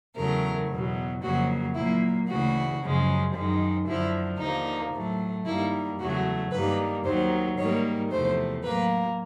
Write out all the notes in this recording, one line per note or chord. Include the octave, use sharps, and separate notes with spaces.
E2 C#3 F#3 A3 A#4
E2 B2 F#3
F2 C#3 F#3 A#3 F#4
A#2 F#3 A#3 E4
D2 C#3 E3 A3 F#4
F#2 C#3 F3 G#3
F#2 D#3 G#3
F#2 D3 F3 E4
D#2 D3 F3 A#3 D#4
A2 F#3 A3
G2 D#3 G3 A#3 E4
E2 C#3 F#3 A3 F#4
G2 D#3 G3 A#3 B4
D#2 D#3 F#3 C5
G#2 D#3 G3 A#3 C#5
E2 C3 F3 A3 C5
A2 F#3 A#3 B4